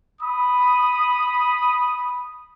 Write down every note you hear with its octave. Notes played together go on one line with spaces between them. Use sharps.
B5 D#6